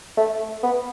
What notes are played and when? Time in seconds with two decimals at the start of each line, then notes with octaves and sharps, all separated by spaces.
0.17 A3
0.63 B3